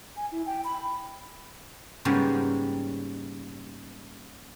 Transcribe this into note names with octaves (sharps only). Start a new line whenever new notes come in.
G#5
E4
G5
B5
G#2 C#3 G3 A#3 B3